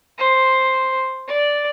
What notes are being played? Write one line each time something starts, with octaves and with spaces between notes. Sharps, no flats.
C5
D5